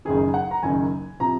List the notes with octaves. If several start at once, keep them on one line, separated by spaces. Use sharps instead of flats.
F#1 F#2 D#3 G#4
F#5
A#5
F#1 F#2 D#3 G#5
C3 F3 A#5